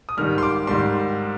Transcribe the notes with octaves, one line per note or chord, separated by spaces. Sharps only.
D#6
G#2 D#3 G3 F6
C6
D6
G#2 D#3 G3 C6